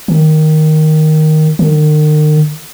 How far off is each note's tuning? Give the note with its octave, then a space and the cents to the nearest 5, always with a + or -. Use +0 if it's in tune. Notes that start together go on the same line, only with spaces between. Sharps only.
D#3 +0
D#3 -40